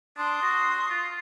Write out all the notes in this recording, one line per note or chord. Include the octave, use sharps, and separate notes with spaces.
D4 C6 D#6
F#4
F4